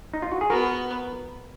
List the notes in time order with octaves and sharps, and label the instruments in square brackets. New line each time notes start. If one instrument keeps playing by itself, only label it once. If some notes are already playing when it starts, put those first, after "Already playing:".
[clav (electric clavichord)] D#4
F4
F#4
G#4
[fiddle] B3 [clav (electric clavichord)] F#4 A#4